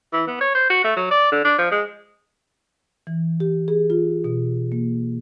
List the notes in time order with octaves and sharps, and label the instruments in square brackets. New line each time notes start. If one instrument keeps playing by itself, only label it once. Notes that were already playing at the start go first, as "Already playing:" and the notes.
[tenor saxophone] E3
B3
C#5
C5
F#4
A3
F#3
D5
D3
D4
F3
G#3
[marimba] E3
G4
G#4
F4
B2
A#3